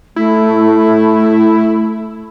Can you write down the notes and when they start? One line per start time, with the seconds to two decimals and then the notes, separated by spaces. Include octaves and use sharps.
0.16 A3 E4